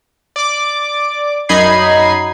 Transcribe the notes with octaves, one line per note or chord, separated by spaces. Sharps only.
D5 D6
F#2 D#4 D#5 B5 G#6 C7